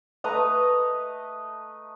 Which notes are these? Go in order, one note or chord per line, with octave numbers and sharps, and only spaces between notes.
A3 B4 D#5 A#5